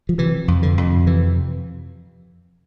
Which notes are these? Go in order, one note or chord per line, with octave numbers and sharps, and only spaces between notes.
F3
C3 E3
F2
D3
F2
C3 E3